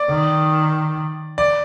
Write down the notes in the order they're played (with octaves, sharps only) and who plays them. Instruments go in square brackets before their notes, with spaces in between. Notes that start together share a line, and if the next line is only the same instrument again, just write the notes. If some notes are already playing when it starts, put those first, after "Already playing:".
Already playing: [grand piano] D5
[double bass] D#3
[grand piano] D5